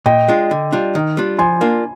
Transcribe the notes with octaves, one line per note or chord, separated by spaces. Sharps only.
A#2 D#5 G5
G#3 D4 F4
D3
G3 D4 F4
D#3
G3 D4 F4
F3 G#5 C6
A#3 D4 F4